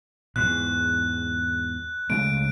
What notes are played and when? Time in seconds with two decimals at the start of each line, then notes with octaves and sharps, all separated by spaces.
0.36 E2 G#2 F#6
2.10 C#3 G#3 A3 D7